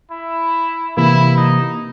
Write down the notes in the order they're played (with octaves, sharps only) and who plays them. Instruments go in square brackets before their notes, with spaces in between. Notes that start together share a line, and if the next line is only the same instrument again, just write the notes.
[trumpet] E4
[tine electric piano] C3 E3 A#3 [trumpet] E4
[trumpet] D#4